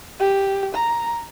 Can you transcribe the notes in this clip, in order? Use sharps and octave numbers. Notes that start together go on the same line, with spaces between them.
G4
A#5